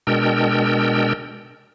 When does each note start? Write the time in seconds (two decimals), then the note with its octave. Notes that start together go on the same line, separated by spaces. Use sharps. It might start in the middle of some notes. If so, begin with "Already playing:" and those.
0.07 B2 G#3 D4 A#4 G5 E6